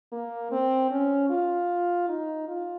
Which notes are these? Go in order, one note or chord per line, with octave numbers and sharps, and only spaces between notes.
A#3
C4
C#4
F4
D#4
F4